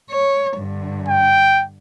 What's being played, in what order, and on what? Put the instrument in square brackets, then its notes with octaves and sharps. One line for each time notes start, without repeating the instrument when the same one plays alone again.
[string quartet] C#5
G2 D3
[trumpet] G5